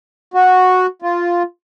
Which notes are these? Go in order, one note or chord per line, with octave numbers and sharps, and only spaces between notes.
F#4
F4